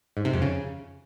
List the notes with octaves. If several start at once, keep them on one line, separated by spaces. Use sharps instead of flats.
G#2
C3
F2
C#3